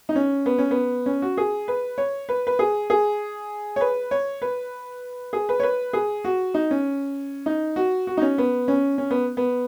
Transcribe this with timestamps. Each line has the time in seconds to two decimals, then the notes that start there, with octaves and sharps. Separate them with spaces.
0.09 D#4
0.15 C#4
0.46 B3
0.58 C#4
0.71 B3
1.06 C#4
1.22 F#4
1.37 G#4
1.68 B4
1.98 C#5
2.29 B4
2.47 B4
2.59 G#4
2.90 G#4
3.76 C#5
3.81 B4
4.11 C#5
4.42 B4
5.33 G#4
5.49 B4
5.60 C#5
5.63 B4
5.93 G#4
6.25 F#4
6.54 D#4
6.71 C#4
7.46 D#4
7.76 F#4
8.07 F#4
8.17 D#4
8.22 C#4
8.38 B3
8.68 C#4
8.98 C#4
9.11 B3
9.37 B3